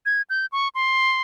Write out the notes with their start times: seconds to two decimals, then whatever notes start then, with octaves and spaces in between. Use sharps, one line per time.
0.06 G#6
0.30 G6
0.52 C#6
0.75 C6